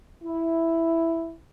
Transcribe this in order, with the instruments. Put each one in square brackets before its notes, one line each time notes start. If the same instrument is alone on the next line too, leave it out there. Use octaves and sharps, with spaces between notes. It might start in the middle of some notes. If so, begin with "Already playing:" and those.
[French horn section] E4